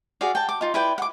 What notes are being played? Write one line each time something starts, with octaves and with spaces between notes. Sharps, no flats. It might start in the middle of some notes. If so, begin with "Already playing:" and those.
F#4 G#4 D5 F5
G5 A5
D6
D#4 F4
E4 B4 D5 G5
F#5 D6